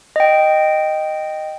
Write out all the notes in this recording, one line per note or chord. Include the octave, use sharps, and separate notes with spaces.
D#5 G5